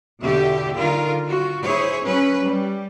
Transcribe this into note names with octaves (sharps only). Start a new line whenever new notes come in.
E2 B2 D3 G4 A4 E5
D3 D#3 F4 A#4
F4 F#4
E4 G#4 C5 C#5
F#3 C#4 B4
G3